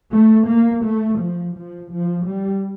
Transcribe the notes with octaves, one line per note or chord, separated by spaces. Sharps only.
A3
A#3
A3
F3
F3
F3
G3